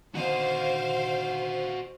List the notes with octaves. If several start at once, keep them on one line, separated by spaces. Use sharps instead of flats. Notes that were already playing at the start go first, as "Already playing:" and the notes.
D3 D#3 B3 F#4 C5 D#5 F5 F#5